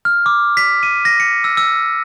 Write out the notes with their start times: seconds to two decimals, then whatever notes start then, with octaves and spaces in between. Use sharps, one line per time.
0.05 F6
0.26 D6
0.57 B6
0.83 D#7
1.05 A#6
1.20 C#7
1.44 E6
1.57 E6